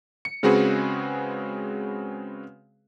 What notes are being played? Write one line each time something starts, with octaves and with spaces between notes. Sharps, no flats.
C#7
C#3 G#3 C4 F#4 G#4 B4